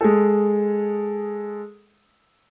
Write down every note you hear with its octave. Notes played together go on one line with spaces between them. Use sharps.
G#3 G#4 A4